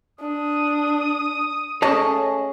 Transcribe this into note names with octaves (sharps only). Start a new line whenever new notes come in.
D4 D#6
A3 C#4 G#4 C#5 D#5 A5